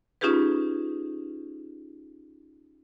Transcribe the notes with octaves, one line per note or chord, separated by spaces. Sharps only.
C#4 D#4 F4 G4 G#4 B4